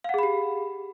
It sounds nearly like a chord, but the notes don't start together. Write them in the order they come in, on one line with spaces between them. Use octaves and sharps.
F5 F#5 G#4 B5 G4